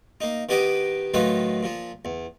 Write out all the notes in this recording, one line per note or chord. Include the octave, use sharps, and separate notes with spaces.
A#3 D#4
D#3 B3 G4 B4 D#5 D6
A2 D#3 F#3 D#4 F4 B4
A#2 F3
E2